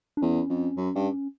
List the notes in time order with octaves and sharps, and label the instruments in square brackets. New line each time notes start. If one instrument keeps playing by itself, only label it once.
[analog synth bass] D4
[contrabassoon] E2 [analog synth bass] C#4
[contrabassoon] F2
F#2
G2